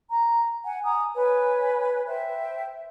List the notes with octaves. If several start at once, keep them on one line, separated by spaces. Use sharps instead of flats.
A#5
F#5 G#5
G#5 A#5 D#6
B4 C#5 G#5
C5 E5 G5